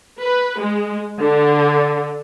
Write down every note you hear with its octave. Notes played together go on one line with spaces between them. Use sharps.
B4
G#3
D3